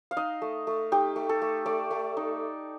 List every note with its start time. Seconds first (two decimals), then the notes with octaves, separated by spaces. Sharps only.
0.11 F5
0.17 D#4 D#5
0.42 A3
0.67 A3
0.92 D#4 G4
1.16 A3
1.29 A4
1.42 A3
1.66 A3 D5
1.91 A3
2.17 D#4